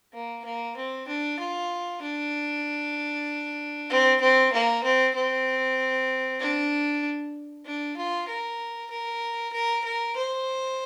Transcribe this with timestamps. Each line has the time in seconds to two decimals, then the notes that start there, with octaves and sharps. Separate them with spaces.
0.13 A#3
0.45 A#3
0.77 C4
1.08 D4
1.39 F4
2.02 D4
3.90 C4
4.21 C4
4.53 A#3
4.84 C4
5.15 C4
6.40 D4
7.66 D4
7.97 F4
8.28 A#4
8.91 A#4
9.53 A#4
9.84 A#4
10.16 C5